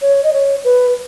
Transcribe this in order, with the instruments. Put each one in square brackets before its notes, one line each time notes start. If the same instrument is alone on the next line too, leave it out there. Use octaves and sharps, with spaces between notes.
[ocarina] C#5
D#5
C#5
B4